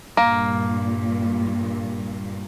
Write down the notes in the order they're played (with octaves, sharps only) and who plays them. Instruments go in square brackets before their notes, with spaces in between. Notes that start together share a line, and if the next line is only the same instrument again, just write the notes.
[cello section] G2 A#2 [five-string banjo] A#3